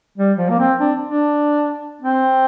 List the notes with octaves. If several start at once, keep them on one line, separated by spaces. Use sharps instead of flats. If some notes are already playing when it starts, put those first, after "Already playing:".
G3
F3
A#3
C4
D4
D4
C4